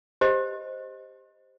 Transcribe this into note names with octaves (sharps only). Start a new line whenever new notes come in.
G4 C5 D#5